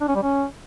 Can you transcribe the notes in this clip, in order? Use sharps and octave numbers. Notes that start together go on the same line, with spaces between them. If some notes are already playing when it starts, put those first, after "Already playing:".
D4
C#4
G3
C#4